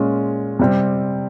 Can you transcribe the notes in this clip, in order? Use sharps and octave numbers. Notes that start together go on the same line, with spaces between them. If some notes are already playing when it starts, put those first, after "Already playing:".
Already playing: A#2 G#3 C#4 F4
C3 G3 C4